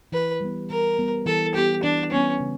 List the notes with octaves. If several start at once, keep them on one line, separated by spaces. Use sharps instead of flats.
E3 B4
G3 B3
E3 A#4
G3 B3
E3 A4
G3 B3 G4
E3 D4
G3 B3 C#4
C#3